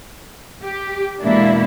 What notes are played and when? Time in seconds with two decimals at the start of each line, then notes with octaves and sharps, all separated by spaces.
0.64 G4
1.23 E2 B2 G#3 A#3 D4 E4